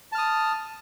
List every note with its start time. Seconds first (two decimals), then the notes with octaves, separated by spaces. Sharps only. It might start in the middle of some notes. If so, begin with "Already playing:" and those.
0.12 A5
0.15 F6
0.18 D#6